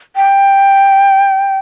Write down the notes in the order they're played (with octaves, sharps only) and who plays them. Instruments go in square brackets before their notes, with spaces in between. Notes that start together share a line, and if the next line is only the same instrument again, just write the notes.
[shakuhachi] G5